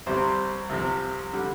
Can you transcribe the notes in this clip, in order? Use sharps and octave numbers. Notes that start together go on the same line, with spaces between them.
C2 C3 G3 C4 C5
C2 C3 F3 C4
D3 G3